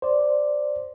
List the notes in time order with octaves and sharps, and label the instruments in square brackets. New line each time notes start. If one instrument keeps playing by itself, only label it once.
[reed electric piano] C5 D5